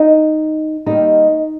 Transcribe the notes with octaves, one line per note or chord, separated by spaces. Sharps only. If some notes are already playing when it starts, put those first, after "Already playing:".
Already playing: D#4
D#2 D#3 G3 D#4